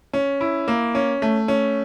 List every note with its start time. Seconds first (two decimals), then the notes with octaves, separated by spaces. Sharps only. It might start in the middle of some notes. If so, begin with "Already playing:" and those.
0.13 C#4
0.41 E4
0.68 A#3
0.95 C#4
1.22 A3
1.48 C#4